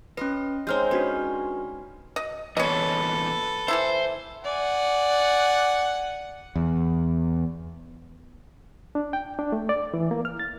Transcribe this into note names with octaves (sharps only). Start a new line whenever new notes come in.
C#4 B4 D#5 C6
G#3 C4 D#4 C#5 F6 G6
C#4 D4 F#4 B4
D#5
E2 A#2 A4 B4 C#5 D#5
E3 E4 C5 E5
D5 F#5 G#5
E2
D4
G5
D4
A3
D5
E3
A#3
F6
A6